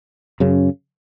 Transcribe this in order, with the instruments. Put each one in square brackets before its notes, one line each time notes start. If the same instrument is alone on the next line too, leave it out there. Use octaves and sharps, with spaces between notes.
[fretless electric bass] F#2 C#3